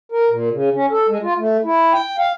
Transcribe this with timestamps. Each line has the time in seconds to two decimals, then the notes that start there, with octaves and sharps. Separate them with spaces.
0.12 A#4
0.30 A#2
0.52 C#3
0.74 C#4
0.91 A4
1.09 G#3
1.22 F4
1.38 A3
1.64 E4
1.93 G5
2.18 F5